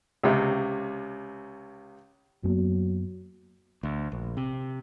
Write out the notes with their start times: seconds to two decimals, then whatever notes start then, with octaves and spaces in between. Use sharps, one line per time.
0.23 C#2 C3
2.44 F#2 F#3 A#3 B3
3.83 D2
4.12 A#1
4.37 C3